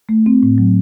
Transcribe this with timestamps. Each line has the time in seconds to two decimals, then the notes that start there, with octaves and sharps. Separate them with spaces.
0.09 A3
0.26 C4
0.43 A2
0.58 F#3